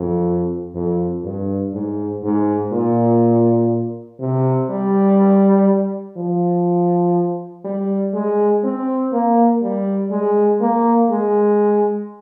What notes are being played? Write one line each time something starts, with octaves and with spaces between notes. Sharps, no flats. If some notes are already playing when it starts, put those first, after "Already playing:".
Already playing: F2
F2
G2
G#2
G#2
A#2
C3
G3
F3
G3
G#3
C4
A#3
G3
G#3
A#3
G#3